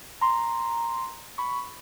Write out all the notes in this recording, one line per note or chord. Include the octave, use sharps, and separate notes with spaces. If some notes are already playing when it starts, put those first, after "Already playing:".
A#5 C6
B5 C#6